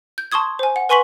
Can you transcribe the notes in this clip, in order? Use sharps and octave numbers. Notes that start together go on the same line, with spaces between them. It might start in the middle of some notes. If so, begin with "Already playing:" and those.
G6
A5 C6 C#6 D#6 G#6
C5 G#5
F#5
B4 G#5 C6 C#6 B6 F#7